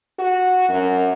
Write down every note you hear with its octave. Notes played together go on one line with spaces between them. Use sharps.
F#4
F#2